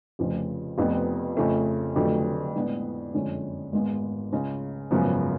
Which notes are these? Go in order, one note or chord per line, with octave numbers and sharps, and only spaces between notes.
F1 F2 C#3 F3
F1 F2 F3 B3
F2 C#3 F3 A3
F1 F2 D3 F#3 A3
A2 G#3 B3 D4
F#1 F2 D3 G#3 C#4
G#1 G#2 G#3 B3
C#2 C#3 G#3
G#1 F#2 C#3 F3 B3